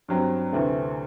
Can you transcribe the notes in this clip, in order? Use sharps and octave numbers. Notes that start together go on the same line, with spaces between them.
G2 F#3 C4
D2 C3 E3 A3 C4